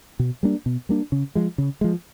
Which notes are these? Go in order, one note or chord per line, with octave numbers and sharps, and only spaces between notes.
B2
G3 A#3 D4
B2
G3 A#3 D4
C#3
F3 G#3
C#3
F3 G#3